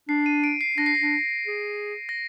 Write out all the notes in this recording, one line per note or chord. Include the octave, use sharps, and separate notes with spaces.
D4 C7
D#7
D7
C7
D4 A#6
C7
A#6
D4
G#4
A#6